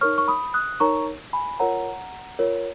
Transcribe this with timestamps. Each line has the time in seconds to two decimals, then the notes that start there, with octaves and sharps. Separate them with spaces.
0.01 D#4 A#4 C#5 C#6 F6
0.18 C#6
0.28 B5 D#6
0.54 D#6 F#6
0.80 D#4 A#4 C#5 A#5 C#6
1.33 G#5 B5
1.59 F4 A#4 C#5 F#5 A#5
2.39 F4 A#4 C#5